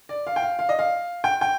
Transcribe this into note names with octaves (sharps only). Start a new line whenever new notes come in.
D5
F5
G5
F5
F5
D#5
F5
G5
G5